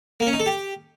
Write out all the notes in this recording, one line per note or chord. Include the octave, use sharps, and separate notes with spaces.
A#3
C#4
D#4
A4
G4